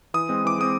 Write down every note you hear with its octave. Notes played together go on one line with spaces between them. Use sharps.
E3 D#6
G#3 C4
E3 D6
G#3 C4 D#6